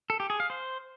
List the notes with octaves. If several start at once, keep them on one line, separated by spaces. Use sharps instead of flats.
A4
G4
G#4
F5
C5